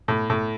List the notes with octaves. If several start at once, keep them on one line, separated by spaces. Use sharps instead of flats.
A2
A2